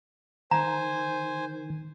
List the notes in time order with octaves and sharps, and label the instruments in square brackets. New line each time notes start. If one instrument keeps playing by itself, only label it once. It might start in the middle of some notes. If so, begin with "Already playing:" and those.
[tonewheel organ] D#3 [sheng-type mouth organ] C5 G#5 [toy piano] A#5